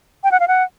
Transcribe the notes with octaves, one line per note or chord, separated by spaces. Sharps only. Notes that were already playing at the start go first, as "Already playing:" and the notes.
G5
F#5
F5
F#5